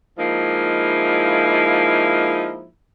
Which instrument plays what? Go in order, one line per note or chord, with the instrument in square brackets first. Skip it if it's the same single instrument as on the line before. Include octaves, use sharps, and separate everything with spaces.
[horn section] F3 G#3 A#3 D#4 E4